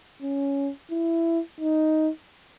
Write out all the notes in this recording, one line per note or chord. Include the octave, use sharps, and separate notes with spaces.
C#4
E4
D#4